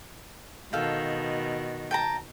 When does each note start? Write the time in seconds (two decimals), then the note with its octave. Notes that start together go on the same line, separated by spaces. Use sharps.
0.73 B2 D#3 A4 F5 G5
1.91 G5 A5 A#5